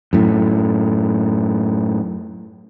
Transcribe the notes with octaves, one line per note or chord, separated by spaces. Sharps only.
F#2 A2